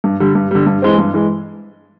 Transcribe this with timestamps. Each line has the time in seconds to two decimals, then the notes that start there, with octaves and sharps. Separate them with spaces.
0.04 G2
0.20 D3 G3
0.35 G2
0.51 D3 G3
0.66 G2
0.82 E3 G#3 C4
0.98 G2
1.14 E3 G#3